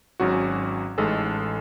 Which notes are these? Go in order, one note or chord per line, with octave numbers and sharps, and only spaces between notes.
G#1 G#2 F#3 C#4 F#4
A1 A2 G#3 D#4 A4